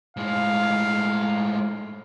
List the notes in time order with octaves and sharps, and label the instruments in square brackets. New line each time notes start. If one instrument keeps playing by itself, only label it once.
[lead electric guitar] A2 G#3 [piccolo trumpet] F5